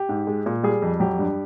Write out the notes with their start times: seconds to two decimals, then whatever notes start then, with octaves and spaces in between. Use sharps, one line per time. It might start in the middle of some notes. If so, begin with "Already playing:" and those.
Already playing: G4
0.09 G#2
0.27 G#3
0.46 A#2
0.63 G3 G#4
0.82 F2
1.00 F#3 G4
1.19 G2